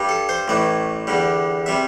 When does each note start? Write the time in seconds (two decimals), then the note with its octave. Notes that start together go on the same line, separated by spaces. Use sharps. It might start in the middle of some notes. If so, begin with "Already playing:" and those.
Already playing: G2 G3
0.09 A4
0.29 C5
0.48 A1 A2 E3 D5
1.07 E2 D3 G3
1.66 C3 G3 E5